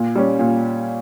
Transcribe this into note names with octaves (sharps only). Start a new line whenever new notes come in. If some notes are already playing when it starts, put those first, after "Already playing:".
Already playing: A#2
G3 C#4
A#2